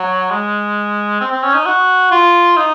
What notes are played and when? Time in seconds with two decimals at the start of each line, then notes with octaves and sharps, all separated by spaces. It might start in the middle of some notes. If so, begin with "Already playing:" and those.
Already playing: F#3
0.30 G#3
1.21 C4
1.31 C4
1.43 C#4
1.54 D#4
1.66 F#4
2.11 F4
2.57 D#4